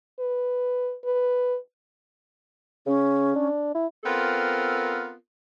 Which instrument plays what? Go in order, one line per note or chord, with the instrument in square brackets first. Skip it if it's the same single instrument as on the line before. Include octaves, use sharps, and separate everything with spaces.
[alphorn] B4
B4
[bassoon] C#3 [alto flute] C#4
[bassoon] D4
E4
[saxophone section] B3 C4 F4 A4 A#4